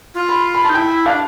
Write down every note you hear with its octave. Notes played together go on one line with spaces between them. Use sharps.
F4
B5
B5
A5
D#4
E4 G5
D4 F5